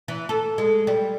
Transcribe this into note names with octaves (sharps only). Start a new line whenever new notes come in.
E3
A4
G#3
G3